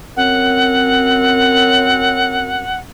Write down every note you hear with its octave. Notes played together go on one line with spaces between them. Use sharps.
F#2 C4 F#5